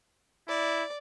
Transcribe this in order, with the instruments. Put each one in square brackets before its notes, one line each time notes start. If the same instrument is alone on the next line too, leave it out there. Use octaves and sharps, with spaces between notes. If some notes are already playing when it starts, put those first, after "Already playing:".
[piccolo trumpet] E4 [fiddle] D5